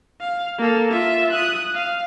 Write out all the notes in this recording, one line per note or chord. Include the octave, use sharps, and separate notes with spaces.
F5
A#3 A4
F4 E5
D#6 F#6
F5